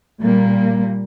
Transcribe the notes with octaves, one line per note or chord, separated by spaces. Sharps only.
A#2 G3 A#3